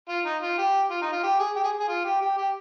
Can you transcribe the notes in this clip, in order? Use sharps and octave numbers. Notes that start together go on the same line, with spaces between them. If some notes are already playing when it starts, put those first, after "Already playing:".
F4
D#4
F4
G4
F4
D#4
F4
G4
G#4
G4
G#4
G#4
F4
G4
G4
G4